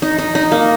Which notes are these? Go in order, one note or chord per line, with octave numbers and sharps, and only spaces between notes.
D#4
D#4
D#4
A#3